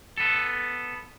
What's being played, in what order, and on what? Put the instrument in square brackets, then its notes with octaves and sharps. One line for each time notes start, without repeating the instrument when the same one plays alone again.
[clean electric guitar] B3 A4